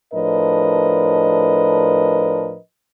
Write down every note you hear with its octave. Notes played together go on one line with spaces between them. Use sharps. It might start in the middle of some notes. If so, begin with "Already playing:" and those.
A2 F3 D4 A#4 B4 D#5